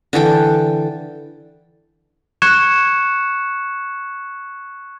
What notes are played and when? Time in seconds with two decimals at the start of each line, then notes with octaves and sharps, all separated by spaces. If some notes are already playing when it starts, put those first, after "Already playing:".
0.13 D3 E3 A4 G5
2.42 C#6 F#6 G#6 C#7 E7